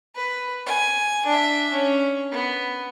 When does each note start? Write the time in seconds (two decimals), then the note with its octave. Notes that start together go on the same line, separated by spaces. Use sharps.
0.16 B4
0.66 G#5
1.26 D4 E5
1.72 C#4
2.32 B3